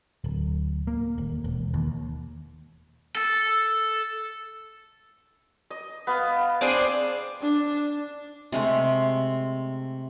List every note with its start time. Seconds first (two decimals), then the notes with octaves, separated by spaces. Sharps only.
0.24 D1
0.87 A#3
1.18 D#1
1.44 E1
1.74 D#2
3.15 A4
5.70 D#5
6.07 B3 F5
6.61 C4 D4 G#4
7.42 D4
8.52 C3 G#3 A3